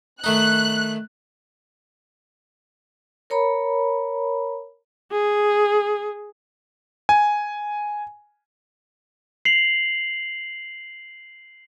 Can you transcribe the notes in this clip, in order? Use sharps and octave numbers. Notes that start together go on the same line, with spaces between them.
D#3 A3 D#4 F#6
A#4 C#5 A#5 B5
G#4
G#5
C7 F7 F#7